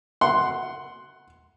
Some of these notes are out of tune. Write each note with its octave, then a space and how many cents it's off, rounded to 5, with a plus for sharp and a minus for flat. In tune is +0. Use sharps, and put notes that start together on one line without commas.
F#5 +5 C6 +0